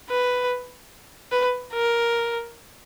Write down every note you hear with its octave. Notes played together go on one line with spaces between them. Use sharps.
B4
B4
A#4